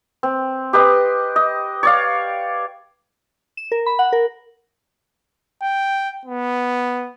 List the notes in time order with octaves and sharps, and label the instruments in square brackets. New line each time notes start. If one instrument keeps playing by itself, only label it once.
[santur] C4
G4 B4 D#5 C6
D#5
C#5 D5 F5
[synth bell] E7
A#4
B5
F#5
A#4
[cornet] G5
B3